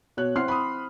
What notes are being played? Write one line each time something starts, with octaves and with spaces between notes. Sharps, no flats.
B2 C#5 F#6
C4 E4 F#5 C6 F6 C7
B5 C6 D#6